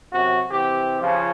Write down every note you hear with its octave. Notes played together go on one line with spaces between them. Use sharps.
F#2 C3 F#4
C3 E3 G4
C#3 F3